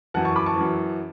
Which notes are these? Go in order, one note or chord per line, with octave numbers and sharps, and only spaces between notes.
F#2 E3 F#5 A5
A5 C#6
B5 D6
A5 C#6
F#2 E3